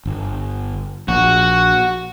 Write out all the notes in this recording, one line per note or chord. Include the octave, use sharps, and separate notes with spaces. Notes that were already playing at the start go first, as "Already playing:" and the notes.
G1
A#1 F#4